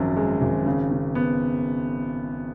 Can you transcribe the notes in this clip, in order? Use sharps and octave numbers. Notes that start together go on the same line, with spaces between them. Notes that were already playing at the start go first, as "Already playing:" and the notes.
Already playing: G#1 F#2 F3
G#3
G#1
C#3
C#3
B3